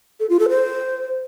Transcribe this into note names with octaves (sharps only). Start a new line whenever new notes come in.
A4
F4
A4
C5